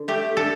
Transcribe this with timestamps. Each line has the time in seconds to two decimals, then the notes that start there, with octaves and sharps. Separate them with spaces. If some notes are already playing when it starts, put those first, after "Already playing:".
Already playing: D3
0.08 A3 G4
0.37 D4 A4